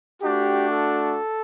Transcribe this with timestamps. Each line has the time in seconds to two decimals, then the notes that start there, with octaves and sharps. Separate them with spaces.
0.21 A3 D4 F#4 G4
0.70 A4